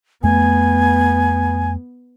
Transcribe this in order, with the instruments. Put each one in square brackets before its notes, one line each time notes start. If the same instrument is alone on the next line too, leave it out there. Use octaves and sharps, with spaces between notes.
[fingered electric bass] F2 A3 [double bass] B3 [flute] G#5